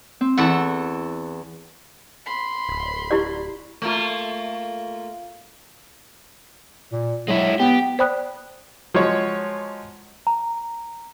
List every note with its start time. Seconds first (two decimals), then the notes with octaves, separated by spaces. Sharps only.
0.21 C4
0.38 E2 E4 A4 F#5 C#6
2.26 B5 C6
2.69 D1
3.11 E4 G4 D5
3.82 A3 A#3 F4
6.93 A#2
7.28 F#3 G#3 E4
7.60 B3 G4
7.99 C5 D5 G5 B5 D#6 F#6
8.94 F3 F#3 G#3 C#5
10.27 A#5